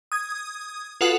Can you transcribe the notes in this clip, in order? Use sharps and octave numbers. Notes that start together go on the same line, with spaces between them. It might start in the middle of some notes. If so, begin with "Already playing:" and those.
D#6 G#6
F4 F#4 A4 B4 F#5 D#6